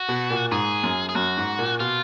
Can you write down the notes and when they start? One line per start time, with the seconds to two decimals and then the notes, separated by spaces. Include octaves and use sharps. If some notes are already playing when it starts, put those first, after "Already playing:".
Already playing: F#4
0.08 B2
0.30 A#2
0.51 G#2 G#4
0.83 F#2
1.09 G#4
1.15 F#2 F#4
1.37 G#2
1.59 A#2
1.80 B2 F4